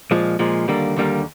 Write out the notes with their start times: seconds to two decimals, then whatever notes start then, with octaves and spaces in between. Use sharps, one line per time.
0.11 A#2 F3 G#3
0.39 A#2 F3 G#3
0.68 D#2 D3 G3 A#3
0.96 D#2 D3 G3 A#3